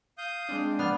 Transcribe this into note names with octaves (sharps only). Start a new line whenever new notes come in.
F5 D#6 G6
G#3 C4 D4
B3 D5 F6